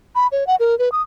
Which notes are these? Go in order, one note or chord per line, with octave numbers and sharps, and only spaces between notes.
B5
C#5
F#5
A#4
B4
D#6